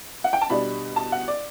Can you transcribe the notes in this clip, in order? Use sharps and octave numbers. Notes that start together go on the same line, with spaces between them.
F#5
G5
A5
B2 G3 D4 B5
A5
F#5
D5